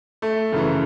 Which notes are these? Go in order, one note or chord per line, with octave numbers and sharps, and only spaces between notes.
A3
F#2 C#3 E3